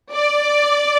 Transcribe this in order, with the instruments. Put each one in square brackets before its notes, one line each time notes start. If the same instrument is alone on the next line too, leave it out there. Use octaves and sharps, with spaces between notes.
[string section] D5